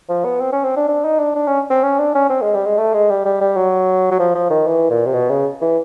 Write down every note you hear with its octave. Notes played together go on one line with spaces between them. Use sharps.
F3
B3
C4
C#4
C4
D4
D4
D#4
D4
D4
C#4
C4
C#4
D4
C#4
C4
G#3
G3
G#3
A3
G#3
G3
G3
G3
F#3
F#3
F3
F3
D#3
E3
A#2
C3
B2
C#3
E3